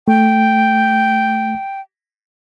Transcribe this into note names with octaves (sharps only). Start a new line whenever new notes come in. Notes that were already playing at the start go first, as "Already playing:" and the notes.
A3 G5